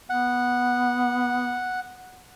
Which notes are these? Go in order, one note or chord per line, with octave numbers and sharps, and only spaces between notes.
B3 F#5